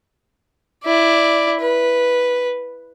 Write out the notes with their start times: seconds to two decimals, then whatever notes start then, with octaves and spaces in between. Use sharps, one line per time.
0.84 E4 D5
1.60 B4